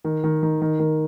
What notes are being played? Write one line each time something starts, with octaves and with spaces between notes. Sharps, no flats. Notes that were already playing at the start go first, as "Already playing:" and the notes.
D#3
D#3
D#3
D#3
D#3